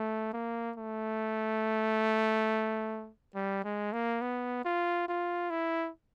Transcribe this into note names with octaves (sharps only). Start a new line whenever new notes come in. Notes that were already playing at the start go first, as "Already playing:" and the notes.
Already playing: A3
A#3
A3
G3
G#3
A#3
B3
F4
F4
E4